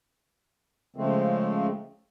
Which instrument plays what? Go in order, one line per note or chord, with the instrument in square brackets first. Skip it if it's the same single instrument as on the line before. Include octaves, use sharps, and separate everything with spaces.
[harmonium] C#3 F3 G#3 A3 C4